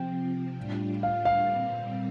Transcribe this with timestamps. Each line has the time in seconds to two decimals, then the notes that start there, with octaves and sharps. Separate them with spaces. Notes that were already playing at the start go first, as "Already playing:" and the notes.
Already playing: C3 F3 C4 G5
0.57 A2 G3 D4 F4
1.03 F5
1.25 F5
1.49 A#2 G3 C4